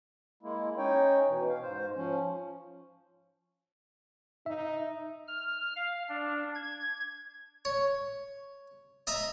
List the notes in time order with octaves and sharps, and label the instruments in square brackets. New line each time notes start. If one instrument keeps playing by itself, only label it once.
[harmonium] G#3 A#3 E4
C#4 D#4 C#5 G5
B2 E3
F5
G#2 C5
F3 C#4
[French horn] D#4 [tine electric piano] E5
[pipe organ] F6
F5
D4
G#6
[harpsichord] C#5
D#5 E5 A#5